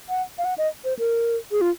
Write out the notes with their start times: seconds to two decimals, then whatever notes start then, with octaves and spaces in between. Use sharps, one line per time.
0.09 F#5
0.38 F5
0.45 F#5
0.58 D#5
0.84 C5
0.99 A#4
1.52 G#4
1.61 F4